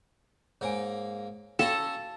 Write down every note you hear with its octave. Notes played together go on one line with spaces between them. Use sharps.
G#2 A#3 C#5 G#5
C#4 F#4 A4 C#5 F5 G5 A#5